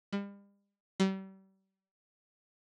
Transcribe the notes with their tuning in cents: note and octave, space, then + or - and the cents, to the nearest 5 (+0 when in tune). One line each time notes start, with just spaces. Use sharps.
G3 +40
G3 -35